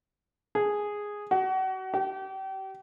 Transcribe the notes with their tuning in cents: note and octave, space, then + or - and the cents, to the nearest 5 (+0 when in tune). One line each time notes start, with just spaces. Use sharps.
G#4 -5
F#4 +35
G4 -35